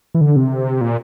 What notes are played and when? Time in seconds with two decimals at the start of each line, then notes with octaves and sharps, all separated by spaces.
0.14 E3
0.21 D3
0.36 C3
0.81 A#2